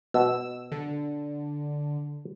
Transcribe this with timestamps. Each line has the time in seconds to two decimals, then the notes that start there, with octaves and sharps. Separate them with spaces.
0.14 B2 E6
0.72 D3